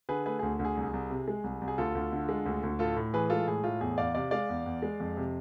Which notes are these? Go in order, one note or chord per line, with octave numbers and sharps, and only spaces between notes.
D3 G#4 B4
A3 G#4 B4
D2 G#4
D2
G#4
C2
C2
C3
G#3
C2
C2
G#4
D2 F4 A4
D2
D3
G#3
D2
D2
A2 F4 A4
A2
E3 G#4 B4
G#3 F4 A4
A2 G#4
A2 F4
E2 G#4
E2 D5 F5
C3 D5 F5
G#3 D5 F5
E2
E2
G#3
F2
C3